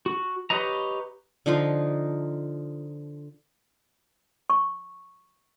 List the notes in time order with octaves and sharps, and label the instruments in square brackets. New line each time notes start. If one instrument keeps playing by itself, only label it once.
[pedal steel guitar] F#4
G4 B4 C#5 D#5 A#5
[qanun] D3 F3 D#4 F4
[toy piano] C#6